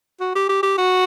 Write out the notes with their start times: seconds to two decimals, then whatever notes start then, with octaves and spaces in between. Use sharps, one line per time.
0.20 F#4
0.35 G4
0.49 G4
0.63 G4
0.78 F#4